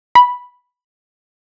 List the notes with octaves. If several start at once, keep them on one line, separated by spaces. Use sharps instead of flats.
B5